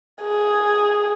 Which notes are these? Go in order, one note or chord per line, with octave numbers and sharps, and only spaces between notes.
G#4